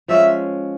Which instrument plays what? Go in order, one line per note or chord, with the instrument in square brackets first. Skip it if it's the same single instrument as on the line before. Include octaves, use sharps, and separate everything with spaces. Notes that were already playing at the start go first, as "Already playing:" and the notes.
[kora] F3 G#3 C#4 [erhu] E5